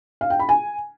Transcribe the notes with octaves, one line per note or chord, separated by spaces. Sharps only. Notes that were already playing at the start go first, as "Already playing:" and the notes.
F5
G5
B5
G#5